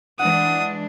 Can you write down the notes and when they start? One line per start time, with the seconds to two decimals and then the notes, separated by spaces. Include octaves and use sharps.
0.19 E3 G#3 D4 F#5 D#6